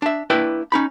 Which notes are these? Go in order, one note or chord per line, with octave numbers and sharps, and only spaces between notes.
D4 E5
A#3 D4 E4 B4 E5 G5
C#4 D#4 B5